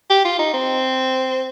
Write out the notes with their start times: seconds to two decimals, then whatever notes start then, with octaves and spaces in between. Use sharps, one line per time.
0.10 G4
0.25 F4
0.39 D#4
0.54 C4